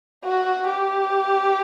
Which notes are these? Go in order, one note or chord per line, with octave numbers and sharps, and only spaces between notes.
F#4
G4